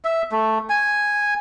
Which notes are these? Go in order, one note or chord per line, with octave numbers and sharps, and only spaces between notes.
E5
A3
G#5